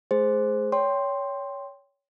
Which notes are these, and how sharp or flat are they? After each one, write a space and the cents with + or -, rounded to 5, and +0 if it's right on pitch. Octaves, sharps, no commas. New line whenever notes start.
A3 -40 G#4 +0 C5 +0
C#5 +20 G5 +0 C6 +0